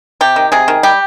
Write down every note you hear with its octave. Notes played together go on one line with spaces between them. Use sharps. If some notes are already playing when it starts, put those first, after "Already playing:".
C3 G4
D#3
C3 G#4
D#3
G3 G4